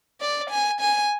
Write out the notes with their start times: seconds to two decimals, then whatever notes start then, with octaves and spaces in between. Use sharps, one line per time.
0.21 D5
0.50 G#5
0.81 G#5